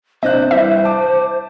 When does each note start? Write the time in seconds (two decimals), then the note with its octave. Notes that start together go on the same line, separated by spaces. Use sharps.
0.23 C3 D4 C5 D#5 F#6
0.51 E3 G3 C5 E5
0.85 A5 D6